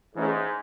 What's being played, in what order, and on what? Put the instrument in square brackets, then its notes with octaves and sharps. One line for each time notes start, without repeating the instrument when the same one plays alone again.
[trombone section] G#2 [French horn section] E3 A3 C#4 E4 G#4